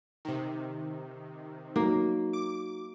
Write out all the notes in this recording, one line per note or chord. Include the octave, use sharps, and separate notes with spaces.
C3 D#3
F#3 A#3 D#4
D6